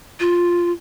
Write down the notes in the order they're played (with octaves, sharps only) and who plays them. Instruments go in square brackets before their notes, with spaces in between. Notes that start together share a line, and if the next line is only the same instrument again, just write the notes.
[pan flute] F4